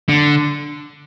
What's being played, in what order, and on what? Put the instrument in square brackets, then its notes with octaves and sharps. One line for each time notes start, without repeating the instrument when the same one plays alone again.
[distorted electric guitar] D3